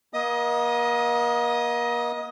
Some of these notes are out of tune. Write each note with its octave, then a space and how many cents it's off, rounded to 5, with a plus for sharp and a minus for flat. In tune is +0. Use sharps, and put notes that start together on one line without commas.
A#3 +40 D#5 +20 D#6 +0